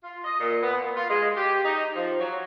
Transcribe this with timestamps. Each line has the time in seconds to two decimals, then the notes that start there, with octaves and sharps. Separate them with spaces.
0.04 F4
0.24 D#5
0.40 A#2
0.63 B3
0.81 A#2
0.96 F4
1.10 G#3
1.36 G4
1.65 D#4
1.95 F3
2.19 F#3